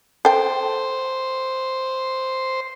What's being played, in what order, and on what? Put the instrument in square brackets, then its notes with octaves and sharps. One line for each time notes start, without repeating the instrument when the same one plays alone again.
[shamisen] A4 G5 [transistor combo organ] C5